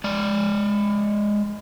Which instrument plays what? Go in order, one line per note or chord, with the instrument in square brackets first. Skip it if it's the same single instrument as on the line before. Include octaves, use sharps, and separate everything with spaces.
[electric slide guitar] G#3 D5